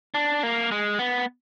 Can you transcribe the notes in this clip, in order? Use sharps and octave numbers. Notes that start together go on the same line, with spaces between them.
D4
A#3
G#3
B3